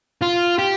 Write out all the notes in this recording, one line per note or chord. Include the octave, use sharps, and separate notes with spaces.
F4
G4